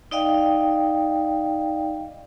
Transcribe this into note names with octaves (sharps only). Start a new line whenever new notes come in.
D#4 D5 D#5 F5 G5